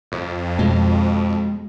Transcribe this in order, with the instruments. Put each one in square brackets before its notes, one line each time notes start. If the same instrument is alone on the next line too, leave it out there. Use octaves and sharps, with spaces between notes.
[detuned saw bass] F2
[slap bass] B2 G#3